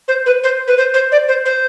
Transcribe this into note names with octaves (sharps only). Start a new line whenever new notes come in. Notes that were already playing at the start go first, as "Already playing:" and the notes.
C5
B4
C5
B4
C5
C5
D5
C5
C5